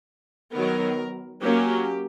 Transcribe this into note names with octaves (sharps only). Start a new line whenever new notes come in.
D#3 F#3 B3 A#4
F#3 A#3 C#4 G4